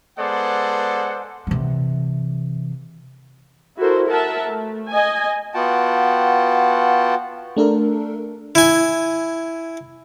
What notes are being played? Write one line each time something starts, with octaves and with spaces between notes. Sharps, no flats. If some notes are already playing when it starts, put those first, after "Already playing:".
G#3 B3 A4 C5 D5 F#5
C3 E3
E4 F#4 A4 A#4 C5
A#4 E5 F#5 A5
A3
D#5 G#5
B3 F4 F#4 F#5 G5 A5
A3 D4 A4 A#4
E4 G#5